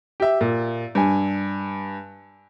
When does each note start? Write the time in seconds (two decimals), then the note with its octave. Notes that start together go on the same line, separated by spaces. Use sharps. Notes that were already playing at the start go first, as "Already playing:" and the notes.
0.20 G4 E5
0.41 A#2
0.95 G2 G#5